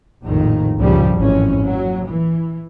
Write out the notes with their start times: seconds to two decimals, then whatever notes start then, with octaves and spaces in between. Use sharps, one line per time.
0.23 A#1 F2 A2 D#3
0.77 C#2 G2 A#2 F3 G3
1.15 G#1 F2 A2 E3 G#3 C#4
1.58 A#2 F#3
2.05 E3